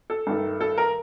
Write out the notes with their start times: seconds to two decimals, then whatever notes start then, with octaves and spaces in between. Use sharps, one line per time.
0.10 A4
0.27 G2 D#3 A3
0.61 A4
0.78 A#4